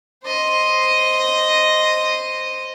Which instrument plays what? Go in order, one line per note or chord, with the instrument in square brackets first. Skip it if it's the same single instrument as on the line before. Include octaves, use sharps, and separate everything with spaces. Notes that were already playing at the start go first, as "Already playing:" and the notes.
[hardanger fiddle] C5 D#5